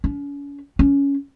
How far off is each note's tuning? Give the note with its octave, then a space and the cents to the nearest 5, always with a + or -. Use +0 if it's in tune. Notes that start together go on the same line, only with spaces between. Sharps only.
C#4 +40
C#4 +10